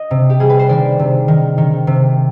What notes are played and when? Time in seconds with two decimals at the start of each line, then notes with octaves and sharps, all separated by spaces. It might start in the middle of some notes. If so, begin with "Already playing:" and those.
Already playing: D#5
0.11 C3
0.30 G4
0.40 G3 G#4
0.50 B4
0.59 C5
0.69 D#3 D5
0.99 C3
1.28 D#3
1.58 D#3
1.87 C3